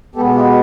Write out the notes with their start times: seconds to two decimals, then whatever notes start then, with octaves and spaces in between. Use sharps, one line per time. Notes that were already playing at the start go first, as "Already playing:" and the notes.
0.15 B2 G#3 B3 G4 A4
0.35 F4 G4